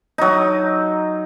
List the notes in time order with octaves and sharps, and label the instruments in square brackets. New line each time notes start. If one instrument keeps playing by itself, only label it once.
[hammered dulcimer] F#3 D#4